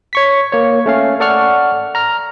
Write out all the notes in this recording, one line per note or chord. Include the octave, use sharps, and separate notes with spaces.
C#5 C#6 B6
A#3 C#5
A3 C#4 F5
A4 D5 F#5 C#6 F6
A#5 F6